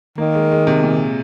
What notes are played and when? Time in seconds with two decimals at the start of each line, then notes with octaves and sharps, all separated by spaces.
0.18 D#3 A#3
0.35 G#3
0.52 G#3
0.67 C3
0.84 A#2